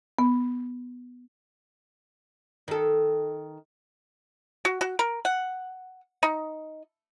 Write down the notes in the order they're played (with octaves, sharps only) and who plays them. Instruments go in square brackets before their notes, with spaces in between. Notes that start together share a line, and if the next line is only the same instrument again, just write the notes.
[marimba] B3
[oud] D#3 A4
[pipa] F#4
F#4
A#4
F#5
D#4